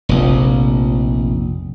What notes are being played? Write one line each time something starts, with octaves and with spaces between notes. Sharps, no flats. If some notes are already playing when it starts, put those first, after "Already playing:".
F1 A#1